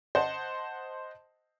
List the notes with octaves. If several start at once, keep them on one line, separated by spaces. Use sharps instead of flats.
C5 D#5 F#5 A5